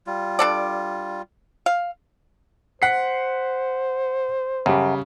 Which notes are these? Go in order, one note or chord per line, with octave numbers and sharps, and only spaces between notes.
G3 F4
D4 A4 D5
F5
C5 F#5 B6 C7
F#2 C#3 G3 G4